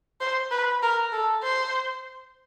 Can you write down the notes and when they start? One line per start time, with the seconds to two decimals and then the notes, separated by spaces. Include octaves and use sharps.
0.21 C5
0.51 B4
0.82 A#4
1.13 A4
1.43 C5